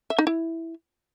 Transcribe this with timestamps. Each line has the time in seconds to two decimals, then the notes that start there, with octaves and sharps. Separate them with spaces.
0.10 E5
0.19 D#4
0.27 E4